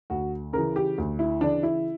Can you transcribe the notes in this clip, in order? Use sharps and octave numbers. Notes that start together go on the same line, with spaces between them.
D2 F#4
C#3 E3 A#4
G4
D2
E4
C#3 E3 D4
E4